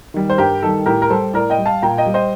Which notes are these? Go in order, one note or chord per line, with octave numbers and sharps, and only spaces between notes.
D#3 G3
C5
G2 G4 A#4
D#3 G3 A4
A2 G4 A#4
A#4
G3 A4 C5
A2 A#4 D5
D#5 G5
G3
F5 A5
A#2 G5 A#5
D#5 G5
G3
C5 D#5